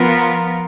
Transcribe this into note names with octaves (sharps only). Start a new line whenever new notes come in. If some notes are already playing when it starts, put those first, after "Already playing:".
Already playing: F3 B3 F4 A#4